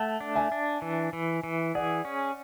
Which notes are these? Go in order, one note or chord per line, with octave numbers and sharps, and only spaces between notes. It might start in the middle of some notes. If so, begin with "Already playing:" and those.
Already playing: A3 F#5 A5
D4
E5 G#5
D4
E3
E3
E3
G#4 D5 F#5
C#4